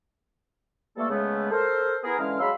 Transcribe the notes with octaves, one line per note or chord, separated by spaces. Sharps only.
E3 G3 A3 A#3 A4
C#3 G#3 A3 B3
A4 A#4 C5
B3 E4 G#4 A#4
D3 E3 G#3 C#4 F5 F6
F#3 G#3 F5 B5 C6 E6